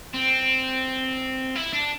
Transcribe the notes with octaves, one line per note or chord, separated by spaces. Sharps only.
C4
E4
D4